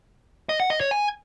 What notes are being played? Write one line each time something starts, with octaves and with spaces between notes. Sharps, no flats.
D#5
F#5
D#5
C#5
G#5